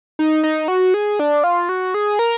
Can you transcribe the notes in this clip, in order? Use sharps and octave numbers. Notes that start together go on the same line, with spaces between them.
D#4
D#4
F#4
G#4
D4
F4
F#4
G#4
A#4